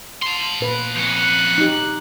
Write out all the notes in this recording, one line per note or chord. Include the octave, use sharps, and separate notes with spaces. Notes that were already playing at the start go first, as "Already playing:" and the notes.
A5 C6
A#2 B4
F2 C#4 F#6
D#4 G4